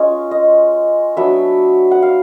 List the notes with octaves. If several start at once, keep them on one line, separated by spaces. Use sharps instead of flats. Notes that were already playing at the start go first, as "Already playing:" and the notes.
Already playing: G#3 C#4 F4 D#5
D#5
F#3 B3 D4 E5
F#5
F5